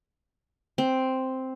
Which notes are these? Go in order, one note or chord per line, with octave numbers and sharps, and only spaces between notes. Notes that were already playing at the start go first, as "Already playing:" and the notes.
C4